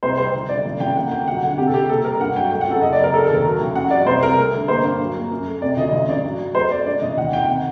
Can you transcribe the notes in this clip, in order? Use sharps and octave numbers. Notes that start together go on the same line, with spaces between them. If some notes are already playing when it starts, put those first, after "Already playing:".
C2 C5
G3 C5
G1
G1 D5
A1
A1 G5
A#3 F#5
G1 G5
F#3 F#5
D3 F#5
C3 G4
A4
C3 G4
A#3 A4
G3 A#4
G2 F#5
F#3 G5
A3 G5
F#5
F#2 A4
F#1 D#5
D5
F#1
A#4
A3 A4
A4
D#2 A#4
F#3
A1
F#2 F#5
F#3 D5
C2 C5
C2 A#4
A3
D3
A#3 C5
G2
F#3
A#3
F#2
A3
C3 D5
D2 D#5
A1 D#5
G2 D5
F#3
F#3
A3 C5
A3 D5
G2 D5
A1 D#5
D#2 F#5
D#3 G5
C3 F#5